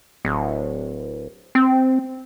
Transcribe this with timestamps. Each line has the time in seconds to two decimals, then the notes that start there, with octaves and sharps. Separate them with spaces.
0.25 D1
1.55 C4